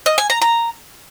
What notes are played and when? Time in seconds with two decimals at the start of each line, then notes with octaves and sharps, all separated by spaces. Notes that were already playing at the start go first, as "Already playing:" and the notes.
0.06 D#5
0.18 G#5
0.30 A#5
0.42 A#5